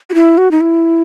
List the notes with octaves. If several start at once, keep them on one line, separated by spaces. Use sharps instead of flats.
F#4
E4
F#4
D#4
E4